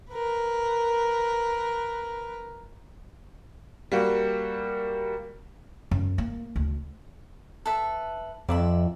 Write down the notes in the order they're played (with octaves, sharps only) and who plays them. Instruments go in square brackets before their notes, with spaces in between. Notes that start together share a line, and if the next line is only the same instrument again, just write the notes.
[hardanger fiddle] A#4 B4
[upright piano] G3 A#3 F#4
[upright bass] F#2
A#3
D2
[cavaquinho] A4 B4 E5
[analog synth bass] F2 [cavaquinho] D5 E5 B5